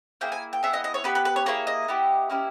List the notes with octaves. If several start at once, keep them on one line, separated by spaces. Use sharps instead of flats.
A#3 E4 G#4 G5
G#5
G5
B3 E4 G#4 E5
D#5
D#5
C#5
B3 G4 B4
B4
B4
C#5
A#3 E4 G#4 C#5
D#5
B3 E4 G4
A#3 C#4 E4 G4